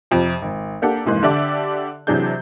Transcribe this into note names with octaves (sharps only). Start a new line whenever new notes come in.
F2 C3 F3
G#1
A#3 D4 G4 A4 F#5
F1 G#2 E3 A#3 C6 F#6
D3 G4 A4 D5 E5
C3 E3 F#3 D4 G#4 G6